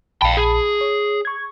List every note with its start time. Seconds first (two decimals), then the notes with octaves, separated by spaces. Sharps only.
0.22 A#1 F5 G5 A5 B5
0.37 G#4
0.81 C#5
1.25 C#6 G#6